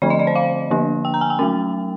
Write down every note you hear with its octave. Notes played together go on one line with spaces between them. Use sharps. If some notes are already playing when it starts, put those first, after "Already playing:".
D3 F3 A3 C4 D5
D#5
D5
C5
F5
D3 F3 A#3 D4
G5
A#5
G#5
G5
F#3 A3 C#4